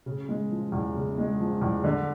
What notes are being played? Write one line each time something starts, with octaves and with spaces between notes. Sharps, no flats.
C#3
G#3
F3
E2
C#3
G#3
F3
E2
D3